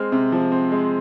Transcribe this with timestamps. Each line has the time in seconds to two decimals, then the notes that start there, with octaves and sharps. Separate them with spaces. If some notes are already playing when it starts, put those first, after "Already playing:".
Already playing: G#3 C4 F6
0.12 C3
0.32 F3
0.52 C4
0.72 G#3